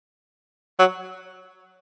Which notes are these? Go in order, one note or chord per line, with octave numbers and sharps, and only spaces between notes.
F#3